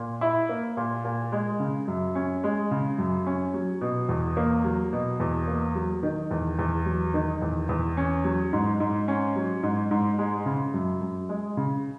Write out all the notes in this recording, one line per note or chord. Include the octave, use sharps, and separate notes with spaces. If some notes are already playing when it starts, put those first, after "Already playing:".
Already playing: A#2
E4
A#3
A#2
A#2
G#3
C#3
F#2
C#4
G#3
C#3
F#2
C#4
F#3
B2
E2
A#3
F#3
B2
E2
A#3
F#3
D#3
E2
E2
F#3
D#3
E2
E2
C#4
F#3
G#2
G#2
C#4
F#3
G#2
G#2
G#3
C#3
F#2
F#2
G#3
C#3